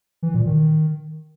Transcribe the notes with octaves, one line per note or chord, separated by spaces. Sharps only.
E3
A#2
D#3